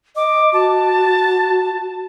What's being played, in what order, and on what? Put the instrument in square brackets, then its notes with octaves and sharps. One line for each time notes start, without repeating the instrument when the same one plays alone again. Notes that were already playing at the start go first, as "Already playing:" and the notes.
[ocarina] D#5 [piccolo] D6
[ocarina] F#4 [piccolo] A5